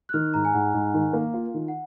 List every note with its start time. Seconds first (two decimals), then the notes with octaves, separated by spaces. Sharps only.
0.09 F#6
0.13 D#3 F6
0.34 G#2 A#5
0.45 G#5
0.54 G#2 F#5
0.74 G#2
0.94 D#3
1.13 A#3
1.34 F4
1.54 D#3
1.68 F#5